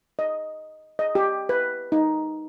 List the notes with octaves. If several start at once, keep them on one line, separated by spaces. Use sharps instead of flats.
D#5
D#5
G4
B4
D#4